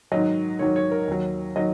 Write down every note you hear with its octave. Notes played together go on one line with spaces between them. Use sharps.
G#2 D#3 F#3 D#5
G#2 D#3 F#3 C#5
C#5
A#4
D#2 D#3 F#3
D#3 F#3 D#5